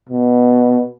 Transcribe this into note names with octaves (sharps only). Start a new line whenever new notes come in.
B2